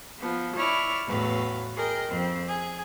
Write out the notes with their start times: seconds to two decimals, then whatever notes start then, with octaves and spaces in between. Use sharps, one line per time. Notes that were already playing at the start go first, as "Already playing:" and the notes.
0.18 F3 B3
0.56 E4 C#5 D5 F6
1.06 E2 A2 F#3 B4 F5
1.75 G#4 A#4 D#5 G5
2.09 F2 C4
2.47 G#4